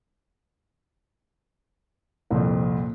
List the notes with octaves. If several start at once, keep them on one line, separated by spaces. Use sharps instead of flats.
C2 F2 A#2